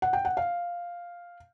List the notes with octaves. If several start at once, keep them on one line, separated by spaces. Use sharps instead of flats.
F#5
G5
F#5
F5